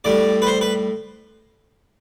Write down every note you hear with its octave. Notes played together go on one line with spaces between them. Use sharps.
A2 G3 D5
B4
C5
B4